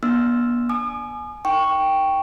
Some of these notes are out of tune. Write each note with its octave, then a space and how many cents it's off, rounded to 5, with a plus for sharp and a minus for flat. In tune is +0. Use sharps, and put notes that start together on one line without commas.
B3 -40 D4 +0 E6 +0
G#5 +25 D#6 -45
D#4 +0 G5 +0 C#6 +0